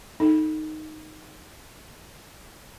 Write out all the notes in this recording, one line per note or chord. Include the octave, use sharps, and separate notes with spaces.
D#4 A4